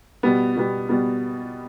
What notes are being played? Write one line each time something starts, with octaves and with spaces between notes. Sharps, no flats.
B2 G3 B3
B2 G3 B3
B2 G3 B3